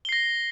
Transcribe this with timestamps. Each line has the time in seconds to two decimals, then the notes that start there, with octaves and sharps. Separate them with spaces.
0.05 G7
0.09 C7
0.12 A#6